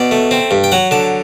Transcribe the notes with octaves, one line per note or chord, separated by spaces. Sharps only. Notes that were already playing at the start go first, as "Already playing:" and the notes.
Already playing: B2 D5
A3
C4
G2
G5
F#3 F#5
D3 A5